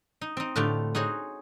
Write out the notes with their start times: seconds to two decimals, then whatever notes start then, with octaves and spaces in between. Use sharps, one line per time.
0.21 D#4
0.37 C4 D#4
0.56 A2 D3 A3 F4 G4
0.95 D#4 F#4 G#4 C5 C#5